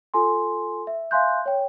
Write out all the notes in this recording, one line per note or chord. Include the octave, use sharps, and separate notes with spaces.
F4 A4 G#5 C6
E5
E5 F5 G#5 C6 F#6 G6
C#5 G5